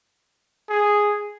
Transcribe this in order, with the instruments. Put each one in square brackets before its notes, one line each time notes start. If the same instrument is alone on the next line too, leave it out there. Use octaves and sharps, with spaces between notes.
[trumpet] G#4